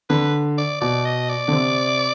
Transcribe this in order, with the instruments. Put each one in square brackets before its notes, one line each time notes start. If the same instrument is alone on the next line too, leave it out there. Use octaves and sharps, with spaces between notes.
[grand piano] D3 [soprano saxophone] B4
[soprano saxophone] D5
[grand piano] B2 [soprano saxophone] D5
[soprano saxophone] D#5
D5
[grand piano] D3
C3